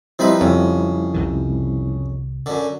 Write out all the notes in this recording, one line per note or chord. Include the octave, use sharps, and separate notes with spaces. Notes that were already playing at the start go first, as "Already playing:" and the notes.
F3 G3 C4 D#4 E4 B4
F2 C#3
C2 C3 D#3
F#2 D3